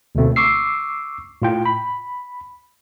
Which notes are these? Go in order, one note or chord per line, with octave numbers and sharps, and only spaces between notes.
D2 B2 A3 C4
C#6 D6 E6 C7
A2 F4 G5
B5